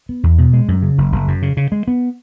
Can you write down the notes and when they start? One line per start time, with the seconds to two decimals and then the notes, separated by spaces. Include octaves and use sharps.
0.09 B3
0.23 E2
0.38 B2
0.53 G#3
0.68 F#2
0.82 C#3
0.98 F#1
1.12 F#1
1.28 F#2
1.42 C#3
1.57 C#3
1.72 G#3
1.88 B3